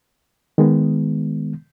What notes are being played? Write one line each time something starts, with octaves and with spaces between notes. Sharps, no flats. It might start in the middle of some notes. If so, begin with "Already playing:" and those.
D#3 G#3 B3